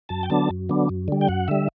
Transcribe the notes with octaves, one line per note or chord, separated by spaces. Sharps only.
F#2 A5
G5
D3 F#3 B3 D4 A5
F#2
D3 F#3 B3 D4
F#2
D3 G3
G5
F#2 F#5
D3 G3 E5